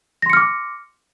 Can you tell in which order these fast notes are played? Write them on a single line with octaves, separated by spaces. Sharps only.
A#6 C6 C#7 F6 D6